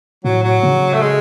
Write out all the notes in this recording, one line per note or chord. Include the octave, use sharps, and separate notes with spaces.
A2 F#3
F#3
C#3
A3
G#3